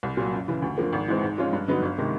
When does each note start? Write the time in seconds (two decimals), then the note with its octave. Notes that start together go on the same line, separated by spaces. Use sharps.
0.03 C2
0.17 A#2 F#3
0.32 F#2
0.48 C#3 E3
0.62 D2
0.78 D3 F3 A#3
0.93 G#1
1.08 G#2 E3 G#3 C4
1.23 G#2
1.38 F3 G#3 C#4 F4
1.53 G2
1.68 D3 F#3 B3 D#4
1.82 G1
1.98 C3 D#3 G#3